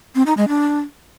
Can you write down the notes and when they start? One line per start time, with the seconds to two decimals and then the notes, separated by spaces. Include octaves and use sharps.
0.15 C4
0.26 D#4
0.37 G#3
0.48 D4